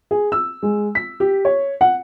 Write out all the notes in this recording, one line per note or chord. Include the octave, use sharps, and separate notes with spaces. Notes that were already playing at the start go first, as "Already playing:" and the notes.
G#4
E6
G#3
B6
G4
C#5
F#5